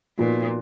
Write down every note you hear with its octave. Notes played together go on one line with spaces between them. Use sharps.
A#2 F3 B3 D#4 F#4